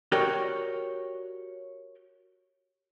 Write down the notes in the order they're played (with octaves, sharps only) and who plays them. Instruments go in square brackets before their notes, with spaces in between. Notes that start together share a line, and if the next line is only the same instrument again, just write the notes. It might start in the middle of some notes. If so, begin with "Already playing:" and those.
[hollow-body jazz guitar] F#4 G4 A#4 C#5 D5 G5